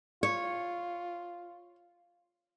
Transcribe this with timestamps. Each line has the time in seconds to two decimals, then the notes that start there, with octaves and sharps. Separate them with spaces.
0.23 F4 C#5